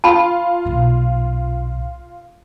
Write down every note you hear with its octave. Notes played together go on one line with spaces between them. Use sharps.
F4 A5 B5
B1 A#2